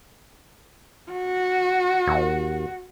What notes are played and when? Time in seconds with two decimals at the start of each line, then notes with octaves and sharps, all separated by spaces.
1.11 F#4
2.07 D#2